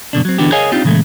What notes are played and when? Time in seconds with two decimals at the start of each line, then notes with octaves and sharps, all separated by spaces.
0.13 F#2 B2 D3 D4
0.25 F#3 C4
0.38 D3 E3 B3 D4 F#4 G4
0.52 G#4 A#4 C#5 D#5 F5 G#5
0.72 C4 D4 D#4 F4 G4
0.84 A#2 C#3 E3 G#3 A3